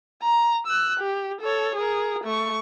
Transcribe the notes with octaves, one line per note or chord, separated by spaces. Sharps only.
A#5
E6 F#6
G4
A4 C#5
G#4 A#4
A3 C#6